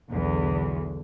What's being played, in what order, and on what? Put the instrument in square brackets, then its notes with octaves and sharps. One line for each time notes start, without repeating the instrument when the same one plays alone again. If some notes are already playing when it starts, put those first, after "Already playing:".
[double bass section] B1 D3 [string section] E2